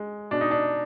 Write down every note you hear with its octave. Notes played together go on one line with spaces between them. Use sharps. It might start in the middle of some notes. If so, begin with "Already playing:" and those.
Already playing: G#3
B2 D4
D#4
D4